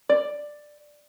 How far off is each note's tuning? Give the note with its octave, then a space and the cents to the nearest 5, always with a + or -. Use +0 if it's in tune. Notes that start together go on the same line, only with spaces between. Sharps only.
D5 +10